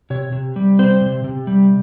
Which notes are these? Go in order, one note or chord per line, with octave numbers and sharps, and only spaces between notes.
C3 C#5
C3
G3
C4 C5
C3
C3
G3